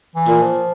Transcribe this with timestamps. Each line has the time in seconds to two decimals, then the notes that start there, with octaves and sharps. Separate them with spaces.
0.15 E3
0.28 A#2
0.41 F3